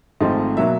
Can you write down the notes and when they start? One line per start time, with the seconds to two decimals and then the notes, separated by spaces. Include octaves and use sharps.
0.20 G#1 G#2 F3 A3 C4 D#5
0.57 B2 F#3 A#3 E5